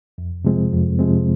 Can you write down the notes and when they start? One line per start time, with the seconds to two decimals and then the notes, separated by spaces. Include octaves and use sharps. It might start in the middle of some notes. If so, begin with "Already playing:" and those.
0.18 F2
0.45 C3 F3 G#3 C4
0.73 F2
0.99 C3 F3 G#3 C4